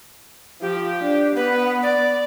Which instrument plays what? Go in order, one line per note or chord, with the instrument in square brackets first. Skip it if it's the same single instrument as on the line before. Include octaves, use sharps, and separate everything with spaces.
[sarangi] F3 [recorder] G4
[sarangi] D4
[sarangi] B3 [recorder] B4
[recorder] D5